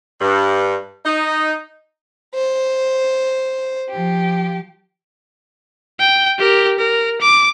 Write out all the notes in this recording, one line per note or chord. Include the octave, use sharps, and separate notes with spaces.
G2
D#4
C5
F3 G4
G5
G4 A#4
A#4
D6